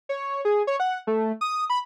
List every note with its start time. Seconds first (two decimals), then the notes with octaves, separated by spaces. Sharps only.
0.09 C#5
0.45 G#4
0.67 C#5
0.80 F#5
1.07 A3
1.41 D#6
1.70 B5